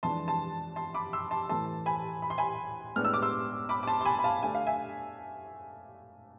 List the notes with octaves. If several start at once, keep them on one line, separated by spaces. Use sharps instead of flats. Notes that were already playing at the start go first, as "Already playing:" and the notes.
F2 E3 G#3 D4 A5 C6
A5 C6
A5 C6
B5 D6
C6 E6
A5 C6
A2 E3 A3 A5 C6
G#5 B5
B5
C6
G#5 B5
A2 G#3 B3 D4 F6
E6
D6
C6 E6
B5 D6
D6
A5 C6
C6
G#5 B5
B5
F5 A5
D3 A3 D4 G#5
F5
E5 G#5